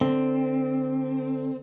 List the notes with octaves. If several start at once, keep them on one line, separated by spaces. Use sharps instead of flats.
D3 C4